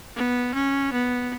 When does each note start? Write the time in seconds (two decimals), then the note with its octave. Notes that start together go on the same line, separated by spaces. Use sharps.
0.17 B3
0.54 C#4
0.93 B3